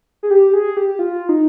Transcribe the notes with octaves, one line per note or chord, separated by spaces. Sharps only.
G#4
G4
G#4
G4
F4
D#4